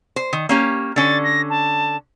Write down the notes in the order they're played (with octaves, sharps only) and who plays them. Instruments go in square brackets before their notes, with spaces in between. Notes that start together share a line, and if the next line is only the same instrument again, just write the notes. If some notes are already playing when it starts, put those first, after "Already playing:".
[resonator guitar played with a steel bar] C5
D#3
A#3 C#4 G4
[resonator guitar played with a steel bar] D3 C#4 [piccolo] A6
[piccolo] A#6
A5